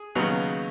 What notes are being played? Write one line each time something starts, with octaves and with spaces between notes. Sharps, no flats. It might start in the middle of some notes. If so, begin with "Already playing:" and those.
Already playing: G#4
D#2 C#3 F#3 B3 D#4